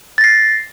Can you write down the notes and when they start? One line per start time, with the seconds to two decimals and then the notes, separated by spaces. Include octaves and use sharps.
0.18 A6
0.21 A#6
0.24 C7